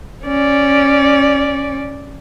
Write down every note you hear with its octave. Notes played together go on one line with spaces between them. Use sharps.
C#4 D5